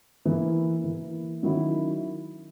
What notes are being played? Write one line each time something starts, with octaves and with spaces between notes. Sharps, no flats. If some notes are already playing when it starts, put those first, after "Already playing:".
E3 A#3 E4
E3 A#3 E4
D#3 F#3 C#4 E4